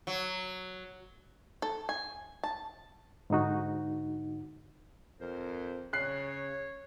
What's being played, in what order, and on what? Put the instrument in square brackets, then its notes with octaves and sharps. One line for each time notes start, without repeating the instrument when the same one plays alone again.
[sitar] F#3
[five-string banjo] A4
G#5
A5
[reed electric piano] G#2 D3 D#4 F#4
[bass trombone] F2 [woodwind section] A#4 C5
[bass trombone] C#3 [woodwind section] C#5 [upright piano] F#6 C7